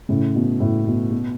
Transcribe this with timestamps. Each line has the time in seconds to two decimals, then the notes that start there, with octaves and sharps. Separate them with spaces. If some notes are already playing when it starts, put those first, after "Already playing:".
0.09 A2 C#3
0.35 B2
0.60 A2
0.87 B2
1.12 B2